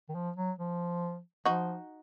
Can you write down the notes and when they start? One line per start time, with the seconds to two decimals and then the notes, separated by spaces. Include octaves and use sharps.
0.09 D#3
0.15 F3
0.36 F#3
0.58 F3
1.45 F3 D#4 F#4